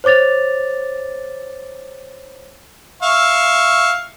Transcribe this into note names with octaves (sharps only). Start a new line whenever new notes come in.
C5 C#5 D6 A6 F7
E5 F5 C#6